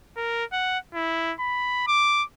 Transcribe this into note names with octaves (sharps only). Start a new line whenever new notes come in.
A#4
F#5
E4
B5
D6